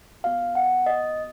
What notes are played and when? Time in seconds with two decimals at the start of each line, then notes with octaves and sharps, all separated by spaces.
0.24 B3 F#4 F5
0.55 F#5
0.86 D#5